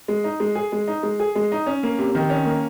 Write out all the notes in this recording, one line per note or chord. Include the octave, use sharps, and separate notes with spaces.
G#3
D#4
G#3
G#4
G#3
D#4
G#3
G#4
G#3
D#4
C#4
A#3
C3
D#3
C#4
A#3